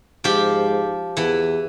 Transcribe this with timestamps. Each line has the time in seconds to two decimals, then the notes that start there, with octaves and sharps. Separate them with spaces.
0.24 G#2 F3 G4
1.17 E2 E3